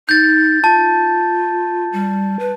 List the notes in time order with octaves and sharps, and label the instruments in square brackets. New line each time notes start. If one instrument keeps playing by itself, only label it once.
[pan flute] D#4 [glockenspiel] G6 A6
[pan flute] F4 [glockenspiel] A5
[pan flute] G3
B4